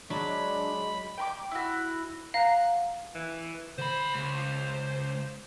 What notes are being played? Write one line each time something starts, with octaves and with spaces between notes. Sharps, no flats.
F#3 G#3 D4 B5
G5 B5 D6
E4 F#4
F5 F#5 A#5
E3
D3 C5 B5
C#2